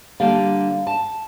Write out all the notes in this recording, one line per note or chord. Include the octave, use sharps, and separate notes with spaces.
D3 G3 A#3 D4 F5
A5